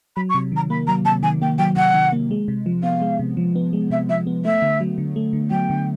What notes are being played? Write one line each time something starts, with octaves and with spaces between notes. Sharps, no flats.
F#3 B5
C#6
C3
D#3 A#5
A#3 B5
F#3 A#5
C3 A5
D#3 G#5
A#3 G5
F#3 G5
C3 F#5
D#3
A#3
G#3
C3
F3
B3 F5
G#3
C3
F3
B3
G#3
C3 E5
F3 E5
B3
A3 E5
D3
F#3
D3
A3
D3
F#3 G5
D3